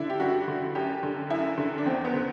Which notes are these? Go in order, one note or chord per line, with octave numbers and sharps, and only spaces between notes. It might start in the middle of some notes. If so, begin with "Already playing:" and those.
Already playing: D3 D4 E4
G4
G2 F#4
D3
F#2 G4
D3
F#2 E4
D3
D4
E2 C4
B3
D3